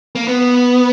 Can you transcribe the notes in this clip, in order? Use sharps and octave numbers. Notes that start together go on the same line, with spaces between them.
A#3
B3